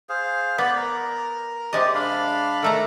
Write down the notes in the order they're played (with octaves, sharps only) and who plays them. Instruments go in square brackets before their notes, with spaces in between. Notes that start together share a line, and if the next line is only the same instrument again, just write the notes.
[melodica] G#4 C5 F5
[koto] B3 [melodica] D5 B5
[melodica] A#4
[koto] C3 G#3 D#5 [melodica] G4 D5
[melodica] D4 F5 B5
[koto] D#3 A3 A#5 [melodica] A4 A#4